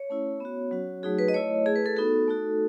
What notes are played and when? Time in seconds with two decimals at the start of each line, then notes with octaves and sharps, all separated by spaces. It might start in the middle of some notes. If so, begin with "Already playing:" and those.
Already playing: C#5
0.10 A3 C#4 E4
0.40 B3 F#4
0.71 F#3 C#4 F#4
1.03 F#3 A3 D#4 F#4 G#4
1.19 B4
1.28 D#5
1.34 A3 E4 C#5
1.66 A3 E4 G#4
1.76 B4
1.86 A4
1.96 B3 D#4 F#4 A4
2.28 A3 D#4 F#4